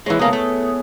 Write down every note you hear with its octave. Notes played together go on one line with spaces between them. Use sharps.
E3 G#3 E4 C#5
C#2 A#3 B3 G#4 A4
A3